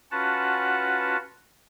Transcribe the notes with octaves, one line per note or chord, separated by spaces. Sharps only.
C#4 F4 F#4 B4 F#5 A5